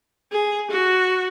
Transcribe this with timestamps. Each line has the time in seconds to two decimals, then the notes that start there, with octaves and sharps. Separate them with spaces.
0.32 G#4
0.70 F#4